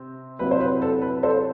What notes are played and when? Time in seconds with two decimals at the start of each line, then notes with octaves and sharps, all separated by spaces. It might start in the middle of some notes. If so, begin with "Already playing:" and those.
Already playing: C3 C4
0.39 C3 F#3 C4 E4 B4
0.51 C5
0.60 B4
0.82 A4
1.02 B4
1.23 A4 C5